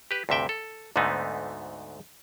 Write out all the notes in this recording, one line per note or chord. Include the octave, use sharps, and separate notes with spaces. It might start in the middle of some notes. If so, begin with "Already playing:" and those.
G4 B4
D2 G2 C3 E5 G5
A4
D2 G#2 D3 A3 B3 D#4